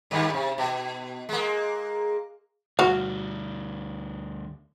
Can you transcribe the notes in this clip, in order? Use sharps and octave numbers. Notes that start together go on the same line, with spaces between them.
G2 D#3 G3
C3
B2
G#3 A#3
D2 G3 F#4 F5